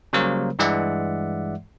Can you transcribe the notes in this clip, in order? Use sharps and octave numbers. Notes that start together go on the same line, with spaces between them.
C#3 F#3 G3 A#3 A#4 C5
G2 E3 G#3 D5 E5 F#5